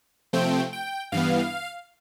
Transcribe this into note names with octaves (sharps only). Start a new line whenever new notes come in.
C3 F3 A3 C4 G5
G5
G2 E3 B3 F5